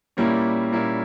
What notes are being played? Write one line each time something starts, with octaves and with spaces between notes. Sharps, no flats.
A#2 G3 A#3 C#4 E4
A#2 G3 A#3 C#4 E4